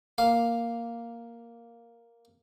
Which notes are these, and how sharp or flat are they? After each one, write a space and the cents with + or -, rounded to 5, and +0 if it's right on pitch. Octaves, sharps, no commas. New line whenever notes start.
A#3 +0 F5 +0 D6 +0